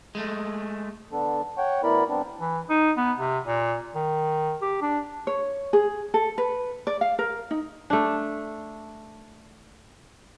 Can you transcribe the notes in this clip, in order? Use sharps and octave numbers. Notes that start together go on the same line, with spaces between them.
G#3 A3
D3 B3 D4 A4
C#5 F#5 G5 C#6
D2 B3 E4 A#4 D5 B5
G2 B3 C4 D4
E3
D#4
B3
C3
A#2
D#3
G4
D4
C#5
G#4
A4
B4
D5
F5
A#4
D#4
A3 D4